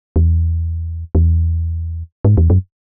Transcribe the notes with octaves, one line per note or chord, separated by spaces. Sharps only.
E2
E2
G#2
E2
F#2